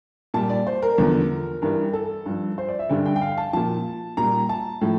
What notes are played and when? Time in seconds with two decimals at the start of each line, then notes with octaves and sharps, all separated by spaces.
0.34 A#2 G3 A5
0.50 D5
0.67 C5
0.82 A#4
0.98 E2 D3 F3
1.62 G2 E3 G3 A#4
1.93 A4
2.26 G2 F3
2.58 C5
2.68 D5
2.79 E5
2.89 G2 D3 G3 G5
3.06 G5
3.16 G5
3.21 F5
3.38 A5
3.53 A#2 F3 A5
4.17 A#2 G3 A#5
4.49 A5
4.81 A2 F3